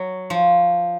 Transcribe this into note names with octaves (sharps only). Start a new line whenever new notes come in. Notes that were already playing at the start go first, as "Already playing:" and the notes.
Already playing: F#3
F3